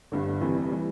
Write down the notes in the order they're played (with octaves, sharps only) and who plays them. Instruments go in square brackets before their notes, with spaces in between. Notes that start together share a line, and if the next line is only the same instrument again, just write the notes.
[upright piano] G1 G2 D3
F1 F2 E3 G3
E3 G3